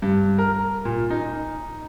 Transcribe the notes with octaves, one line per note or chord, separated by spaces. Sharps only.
G2
A#4
A#2
D#4